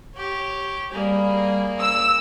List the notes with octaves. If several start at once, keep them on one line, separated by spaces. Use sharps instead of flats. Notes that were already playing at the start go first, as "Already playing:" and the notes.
G4 C#5
G3 A#3 G#4
E6